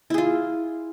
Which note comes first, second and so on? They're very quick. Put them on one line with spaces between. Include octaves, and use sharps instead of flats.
E4 G#4 F4